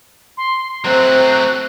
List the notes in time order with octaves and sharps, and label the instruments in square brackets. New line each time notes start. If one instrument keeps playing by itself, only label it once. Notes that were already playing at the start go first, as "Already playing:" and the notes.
[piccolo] C6
[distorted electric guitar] F#3 A3 [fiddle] C4 [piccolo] F#6